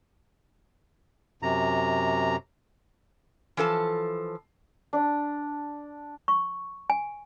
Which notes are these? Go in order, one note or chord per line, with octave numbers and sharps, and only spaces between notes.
F#2 C3 A#5
E3 F3 A4 A5
D4
C#6
G#5